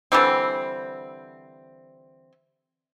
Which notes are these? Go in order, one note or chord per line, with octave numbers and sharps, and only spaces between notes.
D3 E3 G3 C4